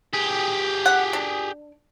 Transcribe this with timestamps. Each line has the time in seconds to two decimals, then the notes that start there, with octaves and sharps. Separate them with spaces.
0.13 G4 G#4
0.86 F#5
1.13 D4